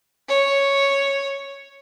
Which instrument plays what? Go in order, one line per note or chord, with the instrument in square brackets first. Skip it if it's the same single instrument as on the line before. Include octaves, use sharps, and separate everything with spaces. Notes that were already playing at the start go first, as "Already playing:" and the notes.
[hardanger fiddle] C#5